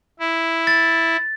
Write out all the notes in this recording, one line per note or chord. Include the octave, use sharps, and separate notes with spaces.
E4
A6